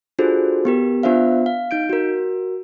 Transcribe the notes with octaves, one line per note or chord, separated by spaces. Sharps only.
D4 F4 F#4 G#4 A4 C5
B3 G4 A#4
B3 D4 F4 C5 E5 F5
F5
D#4 G6 D7
F#4 A#4